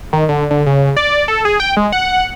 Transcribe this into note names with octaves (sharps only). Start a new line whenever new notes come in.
D#3
D3
D3
C#3
D5
A4
G#4
G5
G#3
F#5